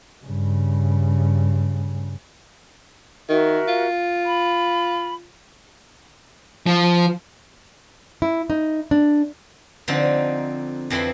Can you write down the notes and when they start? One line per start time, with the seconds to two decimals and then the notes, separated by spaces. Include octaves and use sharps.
0.25 G2 C#3
3.29 D#3 F#4 A#4 E5
3.68 F4
4.24 B5
6.67 F3
8.22 E4
8.50 D#4
8.91 D4
9.88 D3 F3 C4 D#4
10.90 F2 E3 C4 E4 B5 C6